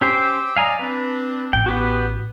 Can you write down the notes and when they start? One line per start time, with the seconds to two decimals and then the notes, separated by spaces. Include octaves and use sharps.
0.01 C#4 G4 C5 G5 D6 E6
0.56 F#3 D5 D#5 F5 G#5 A#5
0.79 C4 D4 B4
1.53 A1 G5
1.66 B3 F#4 G4 B4